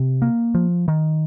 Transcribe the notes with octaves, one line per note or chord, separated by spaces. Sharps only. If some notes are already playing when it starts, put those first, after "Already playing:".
Already playing: C3
A#3
F3
D#3